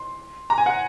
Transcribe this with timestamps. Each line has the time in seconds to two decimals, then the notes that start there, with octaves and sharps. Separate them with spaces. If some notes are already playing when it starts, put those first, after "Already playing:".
Already playing: C6
0.50 A#5
0.58 G#5
0.66 F#5